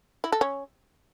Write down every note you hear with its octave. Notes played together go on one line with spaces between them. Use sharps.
E4
A4
C#4